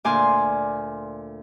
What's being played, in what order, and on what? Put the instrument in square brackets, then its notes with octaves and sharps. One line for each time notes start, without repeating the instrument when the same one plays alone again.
[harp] D2 A#2 D5 G#5 C6 F6